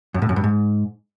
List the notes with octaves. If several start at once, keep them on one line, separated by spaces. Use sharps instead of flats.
F#2
A2
F#2
G2
G#2